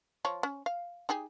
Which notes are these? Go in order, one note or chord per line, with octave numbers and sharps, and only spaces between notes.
F3 C#5
C#4
F5
D#4 G4 G#4